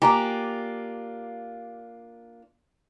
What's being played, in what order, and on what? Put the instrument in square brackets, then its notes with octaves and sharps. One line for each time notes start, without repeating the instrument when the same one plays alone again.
[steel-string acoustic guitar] A#3 D4 F4 [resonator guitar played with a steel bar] G4 [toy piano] G#5 A#5